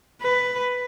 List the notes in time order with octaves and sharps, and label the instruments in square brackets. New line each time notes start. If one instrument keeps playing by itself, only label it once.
[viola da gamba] B4